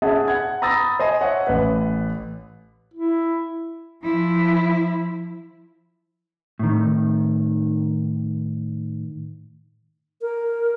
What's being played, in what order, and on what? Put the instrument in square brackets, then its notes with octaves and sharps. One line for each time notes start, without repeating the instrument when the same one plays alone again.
[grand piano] C#4 G#4 E5 F#5 A5
F#5 G#6
A#5 B5 D#6 E6 A6 A#6
C5 D#5 G#5
C#5 E5 F#5
A1 B4
[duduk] E4
[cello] F3 E4
[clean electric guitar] A2 D#3
[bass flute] A#4